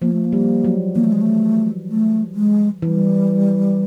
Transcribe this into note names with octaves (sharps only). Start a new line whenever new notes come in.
F3 A#3
A3
A#3
G3
F#3
E3 A#3
A3
G#3
A3
A3
G#3
E3 G3